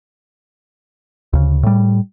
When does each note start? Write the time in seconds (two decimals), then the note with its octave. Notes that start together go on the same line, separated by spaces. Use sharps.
1.33 D2 C#3
1.63 A2 G3